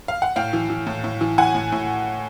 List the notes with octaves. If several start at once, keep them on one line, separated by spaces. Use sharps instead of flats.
F5
F#5
A2 F5 G5
E3
E3
A2
A2
E3
E3 F#5 G#5
A2
A2